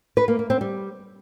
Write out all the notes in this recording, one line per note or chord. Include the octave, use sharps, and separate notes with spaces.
B4
A#3
A#3
C4
G3